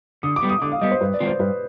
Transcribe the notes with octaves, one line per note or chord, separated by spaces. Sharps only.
D3 D#6
D6
G3 B3
D#6
D3 D6
F5
G3 B3 D#5
C5
G2 B4
D5
D#3 G#3 C4 F4
C5
G2 B4